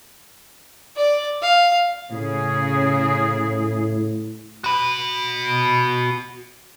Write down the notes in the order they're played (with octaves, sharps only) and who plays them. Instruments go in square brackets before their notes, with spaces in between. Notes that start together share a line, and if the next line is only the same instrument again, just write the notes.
[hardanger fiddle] D5
F5
[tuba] A2 [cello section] C#3 G#4
[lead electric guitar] F#4 B5